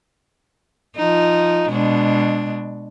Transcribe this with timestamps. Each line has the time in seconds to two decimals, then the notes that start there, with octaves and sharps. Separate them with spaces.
0.97 F3 D#4
1.68 B2 G#3 D4